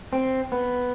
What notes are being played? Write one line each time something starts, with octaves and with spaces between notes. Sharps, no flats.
C4
B3